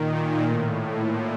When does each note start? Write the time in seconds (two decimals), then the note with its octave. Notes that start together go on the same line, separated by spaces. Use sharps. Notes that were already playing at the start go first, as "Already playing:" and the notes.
Already playing: A#2 D#3
0.42 A2
0.95 A#2